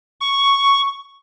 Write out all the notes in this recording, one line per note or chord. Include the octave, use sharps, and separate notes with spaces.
C#6